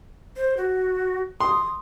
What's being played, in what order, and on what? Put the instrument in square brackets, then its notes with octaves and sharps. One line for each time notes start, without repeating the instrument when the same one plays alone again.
[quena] C5
F#4
[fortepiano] C6 [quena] D#6